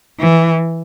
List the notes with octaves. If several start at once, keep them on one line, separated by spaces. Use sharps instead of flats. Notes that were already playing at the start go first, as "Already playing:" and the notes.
E3